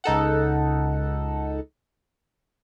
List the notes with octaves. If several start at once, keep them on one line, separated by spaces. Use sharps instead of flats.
C#2 D#4 A4 F#5